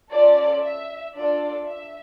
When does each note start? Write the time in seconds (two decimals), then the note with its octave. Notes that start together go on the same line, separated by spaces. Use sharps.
0.12 C#4 F4 A4 D5
0.64 E5
1.15 D4 F4 A4 D5
1.67 E5